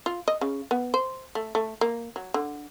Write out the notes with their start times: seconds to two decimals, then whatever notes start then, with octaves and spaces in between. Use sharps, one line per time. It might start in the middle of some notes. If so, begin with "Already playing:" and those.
0.06 F4
0.28 D#5
0.41 C#3
0.71 B3
0.94 C5
1.35 A3
1.55 A3
1.81 A#3
2.16 F#3
2.34 D3